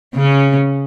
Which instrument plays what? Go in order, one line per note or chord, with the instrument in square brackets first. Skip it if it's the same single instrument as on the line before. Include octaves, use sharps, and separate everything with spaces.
[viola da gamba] C#3 C#4